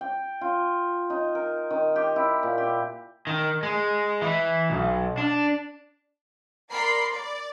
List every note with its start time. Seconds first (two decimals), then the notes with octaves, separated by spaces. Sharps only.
0.01 G5
0.41 F4
1.10 D#4
1.35 A#4
1.71 D#3
1.96 G4
2.16 E4
2.43 A#2
2.58 G4
3.27 D#3
3.63 G#3
4.22 E3
4.70 B1
5.18 D4
6.70 A#4 D5 B5 C6 C7
7.12 D5